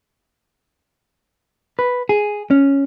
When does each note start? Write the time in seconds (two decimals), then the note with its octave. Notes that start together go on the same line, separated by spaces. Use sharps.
1.79 B4
2.09 G#4
2.51 C#4